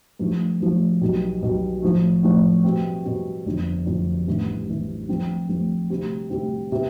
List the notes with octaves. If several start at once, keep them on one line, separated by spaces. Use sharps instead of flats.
G2 F3 A3
G2 F3 A3
B1 B2 G3
B1 B2 G3
A2 F3 A3
A2 F3 A3
B2 G3 C4
B2 G3 C4
G1 F2 D3 F3
G1 F2 D3 F3
A1 G2 E3 G3
A1 G2 E3 G3
G2 F3 A3 C4
G2 F3 A3 C4
D2 C3 G3 C4
D2 C3 G3 C4
C3 G3 B3